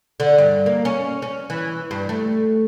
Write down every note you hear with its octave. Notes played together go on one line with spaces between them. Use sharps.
D3
G2
A#3
C#4
C#4
E3
G2
A3